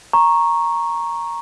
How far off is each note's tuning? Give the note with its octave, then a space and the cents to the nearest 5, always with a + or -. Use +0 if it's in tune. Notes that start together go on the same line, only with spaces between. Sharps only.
A#5 +0 C#6 -10